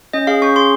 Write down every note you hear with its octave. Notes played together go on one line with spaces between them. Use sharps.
C#4 D#5
G#4 F5
C#4 C#6
G#4 C6